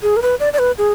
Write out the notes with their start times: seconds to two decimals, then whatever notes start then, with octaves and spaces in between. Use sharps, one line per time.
0.02 G#4
0.16 A#4
0.22 B4
0.40 D5
0.53 D5
0.59 B4
0.78 G#4